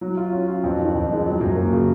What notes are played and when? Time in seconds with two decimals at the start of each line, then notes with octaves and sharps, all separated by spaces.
0.01 F#3
0.17 F4
0.32 C#4
0.48 F4
0.64 F2
0.79 D#3
0.95 F2
1.10 G#3
1.25 F#3
1.41 F#2
1.56 A#3
1.73 C#3